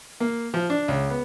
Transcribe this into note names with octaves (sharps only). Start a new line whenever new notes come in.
A#3
F3
D4
C#2
B3